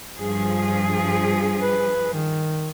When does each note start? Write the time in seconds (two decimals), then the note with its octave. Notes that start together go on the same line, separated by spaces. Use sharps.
0.18 G2 F3 G#4
1.61 B4
2.14 D#3